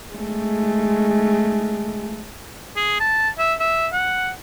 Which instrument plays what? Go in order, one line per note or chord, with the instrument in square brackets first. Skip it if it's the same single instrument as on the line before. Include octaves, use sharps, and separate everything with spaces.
[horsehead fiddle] G#3 A3
[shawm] G#4
A5
E5
E5
F#5